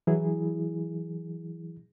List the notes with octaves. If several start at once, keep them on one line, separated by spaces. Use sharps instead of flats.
E3 F#3 E4 G#4